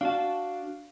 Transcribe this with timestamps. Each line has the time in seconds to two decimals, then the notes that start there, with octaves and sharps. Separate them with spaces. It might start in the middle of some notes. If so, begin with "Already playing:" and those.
0.01 D4 F#4 F5 A5